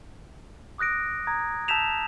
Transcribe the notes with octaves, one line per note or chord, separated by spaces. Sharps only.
D6 D#6 F#6 A#6 D7
A#5 D#6 G#6
A5 E6 G6 B6 E7 F7